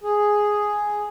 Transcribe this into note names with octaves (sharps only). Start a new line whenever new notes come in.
G#4